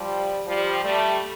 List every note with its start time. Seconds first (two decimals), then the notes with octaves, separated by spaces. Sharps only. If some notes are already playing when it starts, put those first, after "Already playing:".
Already playing: F3 G3
0.47 F3 G3
0.84 G3 A3